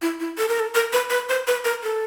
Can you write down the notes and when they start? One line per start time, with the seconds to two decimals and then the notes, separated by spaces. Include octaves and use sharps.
0.02 E4
0.20 E4
0.38 A4
0.48 A#4
0.60 A4
0.75 A#4
0.93 B4
1.10 B4
1.29 C5
1.47 B4
1.65 A#4
1.83 A4